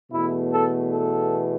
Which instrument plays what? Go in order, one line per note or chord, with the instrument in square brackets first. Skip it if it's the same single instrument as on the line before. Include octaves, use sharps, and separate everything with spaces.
[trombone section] E2 B2 A3 E4
A4
A4